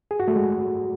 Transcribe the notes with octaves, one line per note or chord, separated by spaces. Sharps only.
G#4
F#4
A3
G#3